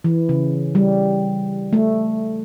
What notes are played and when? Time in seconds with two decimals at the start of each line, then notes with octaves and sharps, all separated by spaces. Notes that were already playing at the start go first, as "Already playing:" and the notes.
0.04 E3
0.29 C#3
0.75 G3
1.73 A3